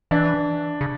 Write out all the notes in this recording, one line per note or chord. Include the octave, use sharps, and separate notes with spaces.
E3 D4
C#3